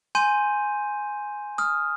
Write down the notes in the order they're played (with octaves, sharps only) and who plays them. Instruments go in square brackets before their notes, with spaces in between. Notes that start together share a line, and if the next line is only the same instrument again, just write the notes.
[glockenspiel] G#5 C6 G6 D#7
D#6 F6